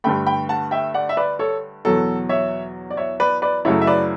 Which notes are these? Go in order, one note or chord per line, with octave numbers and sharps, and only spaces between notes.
G2 D3 A3 G5 B5
G5 B5
F#5 A5
E5 G5
D5 F#5
E5
B4 D5
A4 C#5
E2 B2 F#3 A4
C#5 E5
D5
C#5 E5
B4 D5
B4 D5
F#2 C#3 F#3 A3 E4 A4 C#5
E5
B4 D5